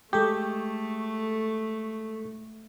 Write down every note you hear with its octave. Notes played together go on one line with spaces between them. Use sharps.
G#3 A3 G4 A4 C#6